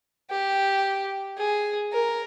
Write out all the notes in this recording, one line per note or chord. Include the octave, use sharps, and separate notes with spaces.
G4
G#4
A#4